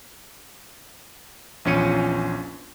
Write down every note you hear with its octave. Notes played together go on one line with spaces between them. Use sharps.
A#1 E2 C#4 F4 C#7 D#7